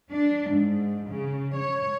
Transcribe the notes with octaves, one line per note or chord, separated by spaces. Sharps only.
D4
G#2
C#3
C#5